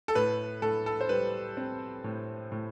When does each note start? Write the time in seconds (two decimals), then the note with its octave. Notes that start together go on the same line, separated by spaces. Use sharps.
0.08 A4
0.15 A2 B4
0.62 A2 A4
0.86 A4
1.01 C5
1.09 G3 B4
1.57 C4
2.04 A2
2.52 A2